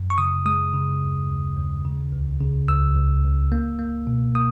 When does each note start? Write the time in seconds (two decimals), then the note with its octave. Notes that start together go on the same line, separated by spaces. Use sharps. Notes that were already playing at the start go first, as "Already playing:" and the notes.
Already playing: F#2
0.10 C#6
0.18 C#3 D#6
0.46 G#3 D#6
0.74 C#3
1.01 D#2
1.29 D#2
1.57 D#2
1.85 C#3
2.12 C#2
2.41 C#3
2.68 C#2 E6
2.95 C#2
3.24 C#2
3.52 A#3
3.79 A#3
4.07 B2
4.35 A#3 D#6